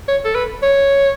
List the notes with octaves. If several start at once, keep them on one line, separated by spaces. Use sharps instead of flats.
C#5
A4
B4
C#5